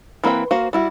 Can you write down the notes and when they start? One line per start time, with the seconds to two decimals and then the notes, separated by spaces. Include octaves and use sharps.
0.24 E3 A#3 C4 B4 G5
0.51 A#3 F#4 C5 F5
0.73 G3 E4 F#4